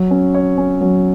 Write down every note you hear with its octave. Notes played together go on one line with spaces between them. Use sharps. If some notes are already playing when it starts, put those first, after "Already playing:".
Already playing: F#3
C#4
C#5
C#4
F#3